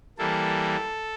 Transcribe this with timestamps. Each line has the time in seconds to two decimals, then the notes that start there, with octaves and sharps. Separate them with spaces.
0.18 E3 G3 A#3 A4